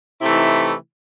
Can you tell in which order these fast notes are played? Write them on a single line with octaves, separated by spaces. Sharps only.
E4 C3 A3 E3 D#4